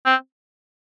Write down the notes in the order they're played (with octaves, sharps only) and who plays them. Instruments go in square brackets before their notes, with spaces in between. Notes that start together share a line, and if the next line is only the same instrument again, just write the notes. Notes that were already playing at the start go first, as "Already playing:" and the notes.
[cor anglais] C4